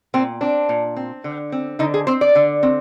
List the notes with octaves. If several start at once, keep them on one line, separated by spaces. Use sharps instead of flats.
A#2 C4
C4 D4
A#2
C4
D3
C4
D3 D#4
G#4
C4 C5
D5
D3
C4